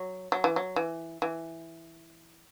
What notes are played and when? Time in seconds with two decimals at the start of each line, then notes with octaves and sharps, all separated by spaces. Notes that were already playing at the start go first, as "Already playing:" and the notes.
Already playing: F#3
0.32 F#3
0.44 E3
0.56 F#3
0.76 E3
1.22 E3